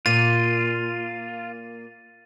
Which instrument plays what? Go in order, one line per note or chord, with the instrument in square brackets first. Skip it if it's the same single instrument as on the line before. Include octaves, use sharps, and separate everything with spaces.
[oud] A#2 [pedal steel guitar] F4 [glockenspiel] A6 D#7